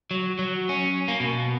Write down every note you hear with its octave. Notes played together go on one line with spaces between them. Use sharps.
F#3
F#3
C#4
A#3
B2